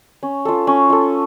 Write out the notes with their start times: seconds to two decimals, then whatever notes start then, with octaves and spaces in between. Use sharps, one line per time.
0.23 C#4
0.45 F4 A4
0.67 C#4
0.90 F4 A4